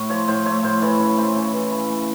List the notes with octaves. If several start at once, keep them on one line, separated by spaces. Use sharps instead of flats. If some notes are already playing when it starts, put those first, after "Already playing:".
Already playing: A2 A3
F3 C#5
A2 C5
A3 C#5
A2 C5
E3 C#5
C#3
A3 C5
C#3 C#5
E3
C#3
A3